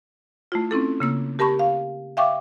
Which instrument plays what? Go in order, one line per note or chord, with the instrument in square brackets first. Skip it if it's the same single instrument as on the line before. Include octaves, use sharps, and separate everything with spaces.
[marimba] A3 E4 F4
C4 C#4 E4 A4
C#3 A#3 E6
G4 A#4 A5 B5 C#6
F5
E5 F5 G5 C#6 D6